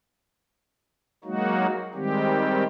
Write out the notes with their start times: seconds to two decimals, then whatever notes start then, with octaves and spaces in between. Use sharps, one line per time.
1.24 F#3 G#3 A#3 D#4 F#4
1.94 D#3 G3 G#3 C4 G4